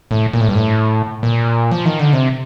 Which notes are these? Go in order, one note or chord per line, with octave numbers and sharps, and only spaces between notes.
A2
A#2
A2
G2
A2
A#2
F3
D#3
D3
C3